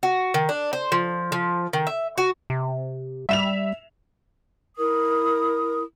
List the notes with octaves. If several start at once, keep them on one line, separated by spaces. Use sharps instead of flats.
F#4
D#3
D4
C5
F3
F3
D#3
E5
F#4
C3
G3 E5 E7 F7
E4 A#4 D#6